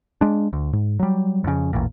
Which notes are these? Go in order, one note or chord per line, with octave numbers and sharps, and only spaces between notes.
G#3 D4
D2
G#2
F#3 G3
F2 C#3
A1 E2 A#2